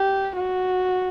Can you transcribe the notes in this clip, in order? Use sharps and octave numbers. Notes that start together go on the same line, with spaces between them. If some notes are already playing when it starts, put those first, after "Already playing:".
Already playing: G4
F#4